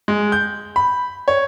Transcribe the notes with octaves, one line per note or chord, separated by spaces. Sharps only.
G#3
G6
B5
C#5